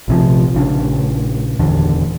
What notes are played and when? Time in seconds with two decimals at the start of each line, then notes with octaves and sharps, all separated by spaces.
0.08 A#1 C3 F3
0.55 A#1 C#3 D4
1.59 D#1 E2 D3 D4